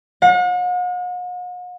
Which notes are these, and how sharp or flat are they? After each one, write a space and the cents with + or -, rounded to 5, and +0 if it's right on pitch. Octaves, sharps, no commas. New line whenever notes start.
F#5 -45